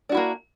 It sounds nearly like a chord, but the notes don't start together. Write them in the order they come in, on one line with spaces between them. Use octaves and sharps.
D4 F#4 E4 A#3